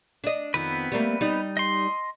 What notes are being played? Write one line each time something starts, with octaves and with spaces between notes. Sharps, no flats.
D4 D#5
F2 D#3 B3 C4 B4
G3 A3 A#3
G3 D#4
D#5 C6